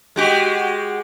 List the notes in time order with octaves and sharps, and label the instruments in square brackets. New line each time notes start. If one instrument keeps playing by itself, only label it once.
[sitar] G#3 F#4 G4